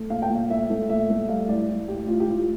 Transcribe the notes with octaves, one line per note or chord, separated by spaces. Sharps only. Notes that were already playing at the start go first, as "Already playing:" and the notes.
Already playing: A3
A#2 F5
G5
A#2
F5
A3 E5
A3
A#2 E5
A3
G3 F5
A2 D5
A2
A2 G4
A2 F4
G4
A2 F4